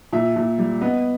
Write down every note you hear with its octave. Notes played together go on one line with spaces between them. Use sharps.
A#2 E5
A#2
G3
B3 D#5